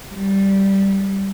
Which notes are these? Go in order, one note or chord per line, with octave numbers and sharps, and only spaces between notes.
G3